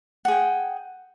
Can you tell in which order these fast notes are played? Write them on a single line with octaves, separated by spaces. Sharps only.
F#5 G#4 G5